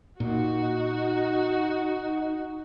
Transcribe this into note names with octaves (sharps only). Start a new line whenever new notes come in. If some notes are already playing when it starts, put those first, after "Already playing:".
A#2 D#4 F#4